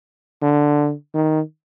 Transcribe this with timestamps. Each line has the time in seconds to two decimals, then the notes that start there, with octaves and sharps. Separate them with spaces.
0.42 D3
1.14 D#3